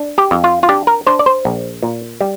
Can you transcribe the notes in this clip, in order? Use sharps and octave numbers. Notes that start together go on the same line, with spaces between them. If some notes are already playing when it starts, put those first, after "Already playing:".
Already playing: D4
G4
F2
F4
F4
D4 G4
A#4
D4 C5
D5
C5
A#1
A#2
G3